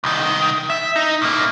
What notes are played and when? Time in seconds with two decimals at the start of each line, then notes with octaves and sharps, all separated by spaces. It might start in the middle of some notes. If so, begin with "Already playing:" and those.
0.04 C2 D#3
0.70 E5
0.96 D#4
1.22 A2 A#3